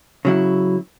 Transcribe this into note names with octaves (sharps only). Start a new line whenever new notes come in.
C#3 F#3 E4